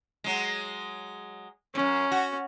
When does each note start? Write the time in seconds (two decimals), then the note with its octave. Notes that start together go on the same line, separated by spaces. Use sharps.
0.24 F#3 G#3
1.75 F#2 A2 C#4
2.12 F#4